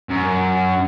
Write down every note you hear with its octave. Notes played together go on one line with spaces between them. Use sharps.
F#2